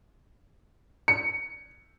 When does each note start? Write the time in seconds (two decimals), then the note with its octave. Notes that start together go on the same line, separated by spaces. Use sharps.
1.08 C#7